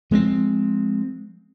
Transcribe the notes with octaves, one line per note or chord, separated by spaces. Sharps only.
F3 G#3 A#3 C4